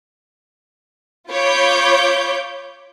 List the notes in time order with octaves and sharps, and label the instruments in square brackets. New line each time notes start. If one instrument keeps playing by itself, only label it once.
[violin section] F4 C#5 B5 D6 G6